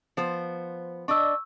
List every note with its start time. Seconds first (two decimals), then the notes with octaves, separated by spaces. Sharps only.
0.17 F3 B3 C5
1.08 D4 D5 D#5 C#6 E6